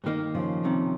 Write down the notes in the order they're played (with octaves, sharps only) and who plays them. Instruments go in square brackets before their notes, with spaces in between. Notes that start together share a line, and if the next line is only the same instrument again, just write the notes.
[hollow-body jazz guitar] G2 D#3 A#3 D#4
[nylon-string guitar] C#3 F3
[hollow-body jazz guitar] C2 C3 D#3